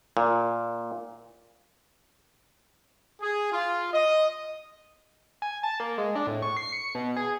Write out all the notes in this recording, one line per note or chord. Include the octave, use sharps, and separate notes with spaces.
A#2
G#4
F4
D#5
G#5
A5
A#3
G#3
D4
A2
C#6
C7
C#7
B2
G#4